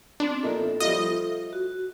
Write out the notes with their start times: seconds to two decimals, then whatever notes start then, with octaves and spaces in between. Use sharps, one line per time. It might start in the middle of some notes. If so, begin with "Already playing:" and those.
0.20 B3 C4 D4
0.43 A#2 D#4 A4 A#4 E5
0.80 F3 G3 F4 D#5
1.53 F#4